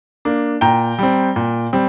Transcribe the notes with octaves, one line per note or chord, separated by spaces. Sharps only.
A#3 D4
A#2 G5 A#5
G3 C4
A#2
G3 C4